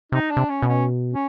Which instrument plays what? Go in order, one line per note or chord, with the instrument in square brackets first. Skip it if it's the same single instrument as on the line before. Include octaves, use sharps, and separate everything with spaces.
[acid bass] C3 [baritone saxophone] D#4
[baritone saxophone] D4
[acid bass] C3
[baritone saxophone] C#4
[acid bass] B2
[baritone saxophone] C#4
C#4